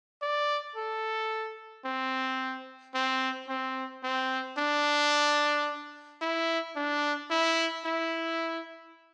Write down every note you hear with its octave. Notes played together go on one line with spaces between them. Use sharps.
D5
A4
C4
C4
C4
C4
D4
E4
D4
E4
E4